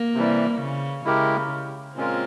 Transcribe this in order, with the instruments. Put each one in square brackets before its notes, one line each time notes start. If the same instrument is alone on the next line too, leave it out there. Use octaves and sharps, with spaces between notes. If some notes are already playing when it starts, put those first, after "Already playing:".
Already playing: [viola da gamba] A#3
[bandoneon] C3 E3 G3
[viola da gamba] C#3
[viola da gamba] C#3 [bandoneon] G#3 E4 G4 A#4
[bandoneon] A#2 G#3 C#4 F4 A#4 [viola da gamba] C4